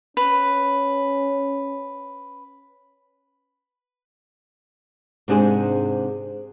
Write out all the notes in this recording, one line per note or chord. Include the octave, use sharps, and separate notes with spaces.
C#4 B4
G#2 C3 D4 G#4 C5